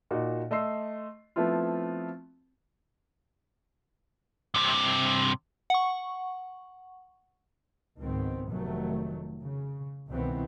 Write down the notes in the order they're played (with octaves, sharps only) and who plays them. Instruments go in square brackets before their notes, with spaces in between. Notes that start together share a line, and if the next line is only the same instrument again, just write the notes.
[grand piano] A#2 D#4 F#4
A3 D#5 C6 E6 C7
F3 A3 B3 C4 E4 F4
[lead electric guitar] G2 C3
[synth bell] F#5 C#6
[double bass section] C#2 G#2 D#3 B3 C4
F1 D#3 F#3 A3
C#3
C2 B2 D#3 E3 B3 C4